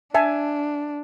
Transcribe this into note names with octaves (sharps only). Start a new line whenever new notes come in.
D4 E5 G#5 A5